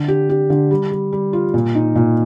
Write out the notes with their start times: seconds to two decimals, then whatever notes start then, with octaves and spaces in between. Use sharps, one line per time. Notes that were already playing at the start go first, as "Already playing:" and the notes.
Already playing: D3
0.08 G4
0.30 G4
0.50 D3
0.71 G3
0.92 G3
1.13 G3
1.33 F4
1.54 A#2
1.75 D#4
1.95 A#2